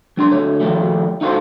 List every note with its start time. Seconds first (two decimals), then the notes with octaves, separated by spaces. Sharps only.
0.17 F#3 D4 C6
0.31 D2 A4 C#5
0.60 D#3 F3 G3 A3
1.21 D#4 F4 F#4 A4 C5